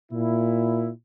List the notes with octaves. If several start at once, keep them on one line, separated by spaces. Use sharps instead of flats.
A#2 E4